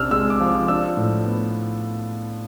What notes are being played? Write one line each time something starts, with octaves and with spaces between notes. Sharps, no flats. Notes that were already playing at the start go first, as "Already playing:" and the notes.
Already playing: C3 D4 E6 F6
G#3 E6
D6
F3
D6
D4 E6
A2
B3